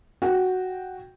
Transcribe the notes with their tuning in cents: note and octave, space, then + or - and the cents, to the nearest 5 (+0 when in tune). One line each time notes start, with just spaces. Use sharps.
F#4 +0 G5 +0